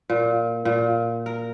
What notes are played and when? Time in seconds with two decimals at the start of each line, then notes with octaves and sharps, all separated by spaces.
0.10 A#2
0.65 A#2
1.26 A#4